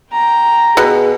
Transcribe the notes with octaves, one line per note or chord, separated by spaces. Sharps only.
G5 A#5
B2 G#4